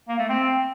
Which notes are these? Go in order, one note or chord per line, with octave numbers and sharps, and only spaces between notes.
A#3
A3
C4